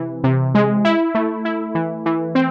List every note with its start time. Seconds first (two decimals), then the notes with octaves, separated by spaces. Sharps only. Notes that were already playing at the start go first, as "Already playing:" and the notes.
Already playing: C3 E3
0.24 C3
0.55 G#3
0.85 E4
1.15 A3
1.45 E4
1.75 E3
2.06 E3
2.35 C4